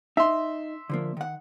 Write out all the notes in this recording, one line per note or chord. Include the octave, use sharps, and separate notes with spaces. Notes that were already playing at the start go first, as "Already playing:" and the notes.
D#4 E5 C6
D3 F3 A#3
D#3 F#5